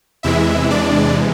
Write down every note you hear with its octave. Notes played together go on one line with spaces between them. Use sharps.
E2 C3 E3 G#3 E4 E5
D4 D5